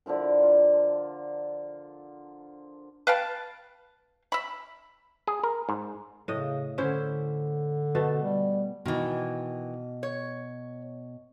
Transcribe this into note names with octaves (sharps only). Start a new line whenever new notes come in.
D3 F3 E4 A#4
F4
B4 F5 G5 A5
E5 B5
G#4
A#4
G#2
A2 C#3 D#5
D3 C#4 E4 C5
B2 A3
G3
B2 D#3 E3
C#5